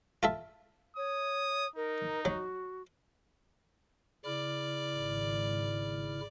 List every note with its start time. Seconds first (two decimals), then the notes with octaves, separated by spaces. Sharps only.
0.23 F4 A4 E5
0.97 C#5 D#6
1.76 D#4 A#4
2.25 F#3 F#4
4.25 C#3 E4 D5 F6
4.95 G#1